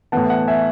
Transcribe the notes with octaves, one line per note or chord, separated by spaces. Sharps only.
A2 E3 B3 F#5 A5
F#5 A5
E5 G#5